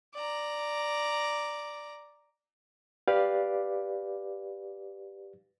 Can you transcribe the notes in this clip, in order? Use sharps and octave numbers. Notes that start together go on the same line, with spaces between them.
D5 A#5
G4 B4 D5 F5